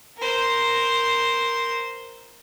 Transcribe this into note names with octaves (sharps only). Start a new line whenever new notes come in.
A#4 C5